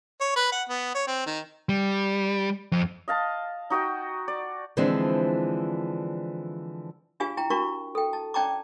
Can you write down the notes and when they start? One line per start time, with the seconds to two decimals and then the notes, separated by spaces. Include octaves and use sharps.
0.21 C#5
0.36 B4
0.52 F#5
0.69 B3
0.95 C#5
1.07 C4
1.26 D#3
1.69 G3
2.72 F2
3.08 D#5 F5 A5
3.70 D#4 F#4 D#5 G5
4.28 D5
4.77 D3 E3 F3 G#3 C4 D4
7.20 D4 F4 G4 F5 G#5
7.37 E4 G5 A#5
7.50 D4 E4 F#4 A#4 A#5 C#6
7.95 A4 G5
8.13 A5
8.34 C#4 D5 G5 A5 A#5 D6